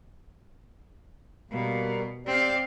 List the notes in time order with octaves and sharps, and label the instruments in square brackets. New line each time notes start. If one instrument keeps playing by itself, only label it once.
[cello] B2 [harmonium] G3 A#3
[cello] C4 F5 [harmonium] G4 D5